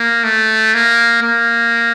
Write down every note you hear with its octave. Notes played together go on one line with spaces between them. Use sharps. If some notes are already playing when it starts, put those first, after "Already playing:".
Already playing: A#3
A3
A#3
A#3